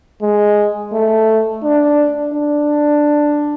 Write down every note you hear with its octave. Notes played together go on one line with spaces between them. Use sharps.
G#3
A3
D4
D4